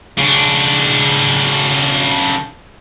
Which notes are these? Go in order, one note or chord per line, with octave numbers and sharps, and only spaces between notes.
C#3 D4